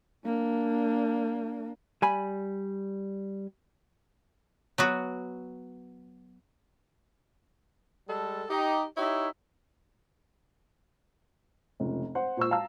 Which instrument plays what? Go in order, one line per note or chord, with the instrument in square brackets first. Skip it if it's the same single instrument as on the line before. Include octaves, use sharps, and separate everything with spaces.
[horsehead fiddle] A#3 D4
[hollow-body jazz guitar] G3 G#5 B5
[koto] F#3 B3 F#4
[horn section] G3 G#3 A4
D#4 G4
D#4 E4 G4 C#5 E5
[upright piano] F1 C#2
C5 F#5 C6
A#2 C5 C#6 E6
F5 A5 A#5 E6